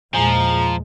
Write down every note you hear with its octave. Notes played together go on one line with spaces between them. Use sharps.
E2 A#2 F3 G#3 G#5 A#5